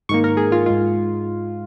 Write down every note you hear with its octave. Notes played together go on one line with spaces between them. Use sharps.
G#2 D#3 A#3 C#6
A#4
G#4
F4
G#2 G#3 F4